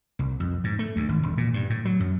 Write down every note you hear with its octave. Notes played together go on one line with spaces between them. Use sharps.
C2
F2
G#2
A3
D2
G#1
E1
A#2
G2
A2
F#3
F#2